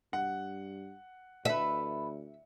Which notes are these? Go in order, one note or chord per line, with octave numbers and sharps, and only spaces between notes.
G2 F#5
D2 A4 B4 E5